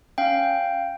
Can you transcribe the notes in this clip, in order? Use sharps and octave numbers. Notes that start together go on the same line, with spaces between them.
C#4 F5 G5